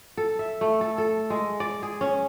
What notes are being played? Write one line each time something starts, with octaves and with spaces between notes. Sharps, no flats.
A4
E5
A3
A4
A4
G#3
D5
G#4
C#4